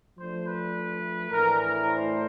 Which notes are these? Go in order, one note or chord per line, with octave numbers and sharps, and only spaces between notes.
F3 A3 D4 C5
B4
A2 E3 A3 D4 A#4
A#4
C5